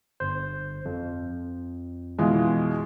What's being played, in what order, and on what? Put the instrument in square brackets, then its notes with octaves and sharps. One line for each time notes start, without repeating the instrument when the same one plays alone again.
[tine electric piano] G1 C5
F2
[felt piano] B2 E3 F4 [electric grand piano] G#3